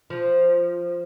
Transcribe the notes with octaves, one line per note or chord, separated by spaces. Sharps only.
F3